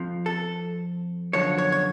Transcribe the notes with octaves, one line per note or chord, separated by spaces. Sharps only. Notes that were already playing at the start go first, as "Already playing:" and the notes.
Already playing: F2 F3
A4
F#2 D3 F3 C#5
C#5
C#5